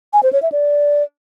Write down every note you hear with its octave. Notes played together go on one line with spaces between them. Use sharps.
G#5
C5
C#5
E5
D5